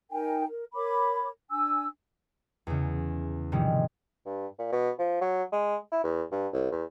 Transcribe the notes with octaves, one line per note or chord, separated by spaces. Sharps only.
D#4 A#4 G5 G#5
A#4
A#4 C#5 B5 D6
D4 G#5 E6
E2 C#3
G#2 C3 D#3 F3 G3 G#3
G2
A#2
B2
F3
F#3
G#3
E4
E2
G2
C2
E2